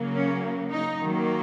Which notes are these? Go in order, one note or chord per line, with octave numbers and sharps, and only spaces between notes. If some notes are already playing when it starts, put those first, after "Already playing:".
Already playing: C#3 F#3 A#3
C#4
D#4
D#3 F#3 A#3